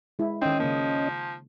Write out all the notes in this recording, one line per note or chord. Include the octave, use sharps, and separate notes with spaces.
G#3 E4
D#3 C4 C#4 D#4 D#5
C#3 F3 A#3